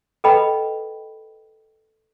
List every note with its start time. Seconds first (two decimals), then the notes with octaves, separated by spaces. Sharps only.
0.24 A4 B4 D#5 F#5 G5 B5